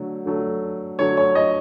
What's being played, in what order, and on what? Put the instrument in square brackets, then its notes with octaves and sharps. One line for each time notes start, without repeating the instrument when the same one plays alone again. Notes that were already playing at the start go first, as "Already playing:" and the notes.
Already playing: [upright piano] D3 F#3 A3
D3 F#3 A3
D3 F#3 A3 C#5
C#5
D#5